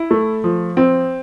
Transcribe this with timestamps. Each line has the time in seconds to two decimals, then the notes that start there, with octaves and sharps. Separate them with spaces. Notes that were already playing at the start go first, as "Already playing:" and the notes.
Already playing: E4
0.11 A3
0.44 F3
0.77 C4